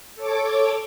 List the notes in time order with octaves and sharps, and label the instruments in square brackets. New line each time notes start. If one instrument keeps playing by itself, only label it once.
[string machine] A4 C#5 D6